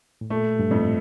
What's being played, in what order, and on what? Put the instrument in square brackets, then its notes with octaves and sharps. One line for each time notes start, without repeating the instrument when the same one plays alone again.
[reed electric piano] A2
[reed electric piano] A#2 [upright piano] A3
[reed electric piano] G2
[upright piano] F2 [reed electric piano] A2